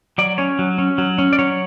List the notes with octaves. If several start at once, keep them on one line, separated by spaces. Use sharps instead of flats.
F#3 D5
C#4 C#5
F#3
C#4
F#3
C#4
D5
F#3 C#5